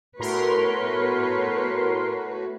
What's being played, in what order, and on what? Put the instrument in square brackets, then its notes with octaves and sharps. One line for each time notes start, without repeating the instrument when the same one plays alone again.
[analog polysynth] A2 A#4 C6 [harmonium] A3 F#4 [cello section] B3 B4 C#5